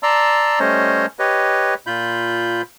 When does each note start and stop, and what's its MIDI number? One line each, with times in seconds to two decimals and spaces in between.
0.03 0.59 74
0.03 0.59 81
0.03 0.59 82
0.03 0.59 84
0.03 0.59 88
0.60 1.06 55
0.60 1.06 57
0.60 1.06 61
0.60 1.06 72
0.60 1.06 73
0.60 1.06 75
1.19 1.74 67
1.19 1.74 71
1.19 1.74 73
1.19 1.74 75
1.87 2.62 46
1.87 2.62 65
1.87 2.62 83
1.87 2.62 91